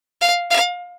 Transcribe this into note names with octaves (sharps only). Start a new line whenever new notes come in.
F5
F5